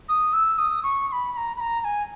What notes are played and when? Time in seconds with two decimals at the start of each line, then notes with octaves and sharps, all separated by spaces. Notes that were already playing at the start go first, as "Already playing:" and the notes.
0.09 D#6
0.33 E6
0.58 D#6
0.83 C#6
1.08 C#6
1.12 B5
1.32 B5
1.37 A#5
1.57 B5
1.60 A#5
1.81 A#5
1.85 G#5